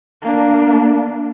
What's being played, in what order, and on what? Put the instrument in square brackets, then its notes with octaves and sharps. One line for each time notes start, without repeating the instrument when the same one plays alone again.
[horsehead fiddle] A#3 D4